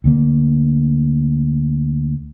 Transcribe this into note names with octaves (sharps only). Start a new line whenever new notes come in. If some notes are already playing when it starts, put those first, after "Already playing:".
D2 D3 A#3